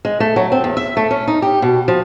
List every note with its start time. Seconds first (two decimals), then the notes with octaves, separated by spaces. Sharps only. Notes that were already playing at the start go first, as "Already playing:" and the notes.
0.05 G#3
0.20 A3
0.36 F#3
0.52 C4
0.64 E2
0.77 E5
0.97 A3
1.11 C#4
1.27 D#4
1.42 G4
1.62 B2
1.88 F3